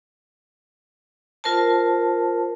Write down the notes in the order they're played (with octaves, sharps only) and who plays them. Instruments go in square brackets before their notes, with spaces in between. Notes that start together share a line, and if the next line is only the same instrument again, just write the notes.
[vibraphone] F4 A#4 C5 A5